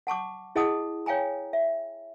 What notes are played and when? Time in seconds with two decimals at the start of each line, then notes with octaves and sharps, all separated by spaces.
0.07 F#5 A5 C#6 D6
0.56 E4 G#4 D#5 F#5 A5 D#6
1.06 C#5 F5 G5 G#5 A#5
1.53 E5